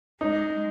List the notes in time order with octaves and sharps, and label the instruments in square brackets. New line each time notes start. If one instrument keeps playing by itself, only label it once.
[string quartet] G#3 [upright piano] D#4